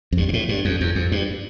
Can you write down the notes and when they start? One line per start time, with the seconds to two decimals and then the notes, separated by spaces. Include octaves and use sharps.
0.12 F2
0.17 G2
0.28 G2
0.33 A2
0.49 G2
0.65 F2
0.81 E2
0.95 F2
1.12 G2